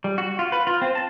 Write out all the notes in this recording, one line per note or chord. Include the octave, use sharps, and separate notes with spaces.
G3
F#4
F4
B4
F4
C4
A5